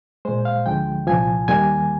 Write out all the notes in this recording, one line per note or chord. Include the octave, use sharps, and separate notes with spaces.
A#2 G#3 C5
F5
D2 D3 F3 G#3 G5
C2 A#2 F3 G#5
D#2 D#3 G3 A#3 G#5